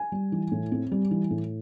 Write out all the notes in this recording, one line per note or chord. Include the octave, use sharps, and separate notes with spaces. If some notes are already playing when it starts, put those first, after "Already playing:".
Already playing: G#5
G3
E3
A2
C4
G3
E3
A2